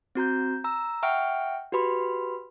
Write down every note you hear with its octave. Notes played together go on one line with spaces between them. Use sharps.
C4 F#4 A#5 G6
A#5 E6
E5 F#5 G5 C#6 F6 D7
F#4 G4 B4 B5 C6